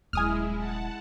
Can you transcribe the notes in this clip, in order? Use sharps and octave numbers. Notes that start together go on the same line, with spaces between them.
D#1 F#3 G#3 E4 G#5 D#6 F6
F#5 A5